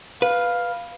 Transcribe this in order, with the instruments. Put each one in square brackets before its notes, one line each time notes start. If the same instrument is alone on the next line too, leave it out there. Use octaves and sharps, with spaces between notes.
[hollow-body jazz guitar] B4 [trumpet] F5